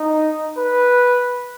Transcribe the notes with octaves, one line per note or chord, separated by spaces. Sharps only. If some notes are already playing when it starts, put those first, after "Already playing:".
Already playing: D#4
B4